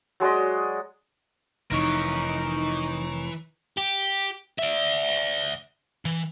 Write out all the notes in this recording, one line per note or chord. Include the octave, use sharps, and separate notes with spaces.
F#3 G#3 D5 D#5
F1 E3 D#4 A#4 C#5
G4
D5 E5
E3